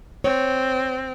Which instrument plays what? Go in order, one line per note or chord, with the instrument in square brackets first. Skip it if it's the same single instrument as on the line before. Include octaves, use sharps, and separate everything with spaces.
[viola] C4 [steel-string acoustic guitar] C#5